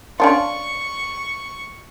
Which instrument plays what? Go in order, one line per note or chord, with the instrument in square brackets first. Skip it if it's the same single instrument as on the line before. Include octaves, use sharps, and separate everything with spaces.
[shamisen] C#4 D4 F4 [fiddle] C#6